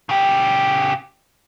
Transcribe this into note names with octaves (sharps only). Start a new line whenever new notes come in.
C#3 G4